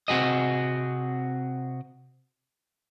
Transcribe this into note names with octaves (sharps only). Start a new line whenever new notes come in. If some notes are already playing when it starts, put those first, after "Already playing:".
C3 C4 F#4 G#4 D#5